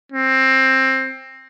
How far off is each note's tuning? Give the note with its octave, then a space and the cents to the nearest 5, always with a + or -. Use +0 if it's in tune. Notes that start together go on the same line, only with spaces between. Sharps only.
C4 +15